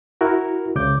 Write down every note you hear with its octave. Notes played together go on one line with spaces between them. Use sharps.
E4 F#4 A#4
C#2 C#3 D6 G6